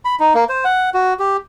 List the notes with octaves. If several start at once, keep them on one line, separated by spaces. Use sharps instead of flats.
B5
D#4
A#3
C5
F#5
F#4
G4